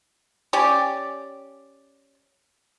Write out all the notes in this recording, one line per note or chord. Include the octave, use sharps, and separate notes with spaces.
C#4 G4 D5